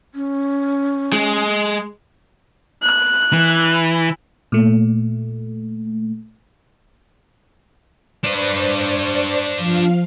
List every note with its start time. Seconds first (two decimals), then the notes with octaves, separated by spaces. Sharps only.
0.15 C#4
1.13 G#3
2.83 F#6
3.33 E3
4.52 A#2 A3
8.24 D4 B4 C5 D5 C#6
9.56 F3 F5